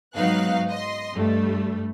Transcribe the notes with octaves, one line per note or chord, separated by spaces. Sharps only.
G#2 F#3 B3 D#4 F5 F#6
D#5 C6
G2 G3 A3